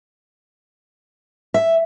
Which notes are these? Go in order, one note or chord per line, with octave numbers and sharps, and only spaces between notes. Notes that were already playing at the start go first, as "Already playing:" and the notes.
E5